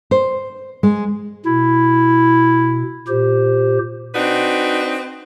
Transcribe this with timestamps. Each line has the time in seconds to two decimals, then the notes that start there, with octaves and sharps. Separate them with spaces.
0.11 C5
0.83 G#3
1.46 B2 E4
3.08 A#2 G4 C5
4.15 C4 D4 D#4 F#4 B4